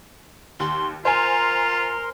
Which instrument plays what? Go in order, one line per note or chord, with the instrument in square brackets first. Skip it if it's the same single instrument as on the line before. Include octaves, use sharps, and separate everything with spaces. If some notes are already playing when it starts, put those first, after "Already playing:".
[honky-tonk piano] D#2 [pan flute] C6
[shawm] F4 [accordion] A#4 C6 [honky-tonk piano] C5 G#5 [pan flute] A#5